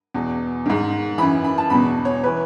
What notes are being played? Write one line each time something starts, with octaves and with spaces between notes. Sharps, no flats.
E2 B2
G#2 D#3
F#2 E3 B5
B5
A5
E2 B2 B5
C#5
E3 B4